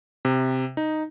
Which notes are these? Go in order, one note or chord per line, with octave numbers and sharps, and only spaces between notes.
C3
D#4